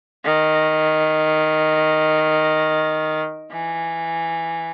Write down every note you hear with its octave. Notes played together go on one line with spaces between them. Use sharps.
D#3
E3